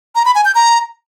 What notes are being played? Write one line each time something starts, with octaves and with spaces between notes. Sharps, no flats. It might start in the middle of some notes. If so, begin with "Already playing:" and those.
A#5
B5
G#5
G6
A#5